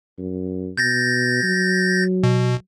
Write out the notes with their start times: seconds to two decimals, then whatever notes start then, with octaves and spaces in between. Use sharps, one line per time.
0.18 F#2
0.77 B2 G6 A6 A#6
1.43 F#3
2.23 B2